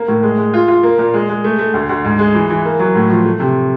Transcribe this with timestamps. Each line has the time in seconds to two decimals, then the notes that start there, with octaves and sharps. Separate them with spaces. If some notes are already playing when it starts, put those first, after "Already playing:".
Already playing: A#3
0.08 A2
0.23 G#3
0.38 G#3
0.54 F4
0.68 F4
0.83 A#3
0.98 A#2
1.14 G#3
1.29 G#3
1.44 A3
1.58 A3
1.74 D2
1.89 D2
2.04 G#2
2.19 G#3
2.34 E3
2.50 E3
2.65 A#3
2.79 F#3
2.95 A2
3.10 F3
3.25 A3
3.40 C3